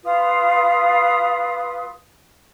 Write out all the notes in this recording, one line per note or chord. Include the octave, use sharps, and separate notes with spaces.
F4 B4 D#6